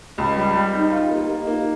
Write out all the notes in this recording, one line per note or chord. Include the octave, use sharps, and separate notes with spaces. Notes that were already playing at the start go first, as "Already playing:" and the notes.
C#2 D#5
G3
G3
D#4
F4 D#5
G4
A#3
G4
A#3 F4
D#4
A#3